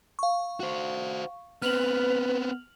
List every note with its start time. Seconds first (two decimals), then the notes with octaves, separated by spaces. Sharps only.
0.19 F5 C#6
0.60 F#4 C5
1.62 B3 C4 B4 F6 F7 F#7